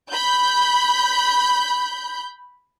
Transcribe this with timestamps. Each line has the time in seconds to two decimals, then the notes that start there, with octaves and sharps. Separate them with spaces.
0.11 B5 G6